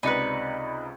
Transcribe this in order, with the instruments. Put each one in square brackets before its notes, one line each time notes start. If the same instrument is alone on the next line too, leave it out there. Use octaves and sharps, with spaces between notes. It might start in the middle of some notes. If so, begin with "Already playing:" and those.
[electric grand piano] C#2 C3 B5 [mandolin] D#4 B4 [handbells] D5 C#7